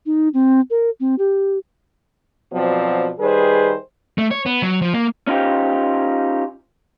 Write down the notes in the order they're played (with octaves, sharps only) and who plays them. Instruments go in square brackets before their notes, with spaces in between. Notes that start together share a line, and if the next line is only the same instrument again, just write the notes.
[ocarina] D#4
C4
A#4
C4
G4
[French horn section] B2 F3 F#3 C4 D5
D#3 G3 G#4 B4 C5
[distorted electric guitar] A3
C#5
B3
F#3
F3
A#3
[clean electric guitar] C#4 D#4 F4 G4 C5